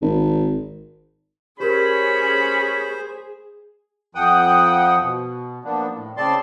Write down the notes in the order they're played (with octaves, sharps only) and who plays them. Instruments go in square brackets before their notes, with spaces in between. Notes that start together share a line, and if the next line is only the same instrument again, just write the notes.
[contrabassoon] G#1
[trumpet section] C#4 B5 [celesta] G4 A#4 [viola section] G#4 [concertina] C5
[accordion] F2 F3 F#5 G5 D#6
B2
F3 A#3 B3 D4
A2
C#3 C4 D5 A5 C6